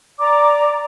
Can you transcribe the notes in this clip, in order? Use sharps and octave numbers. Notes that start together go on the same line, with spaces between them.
D5 A#5 D6